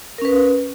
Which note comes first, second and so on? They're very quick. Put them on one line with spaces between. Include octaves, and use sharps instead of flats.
A#4 C#4 B4